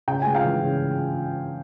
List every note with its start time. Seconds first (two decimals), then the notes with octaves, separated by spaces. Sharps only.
0.08 C#3 G5
0.22 G#3 G#5
0.35 F5 G5
0.45 E3
0.63 C#3